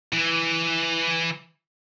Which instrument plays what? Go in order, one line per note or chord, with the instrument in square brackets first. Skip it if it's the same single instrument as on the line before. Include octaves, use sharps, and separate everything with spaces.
[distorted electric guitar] E3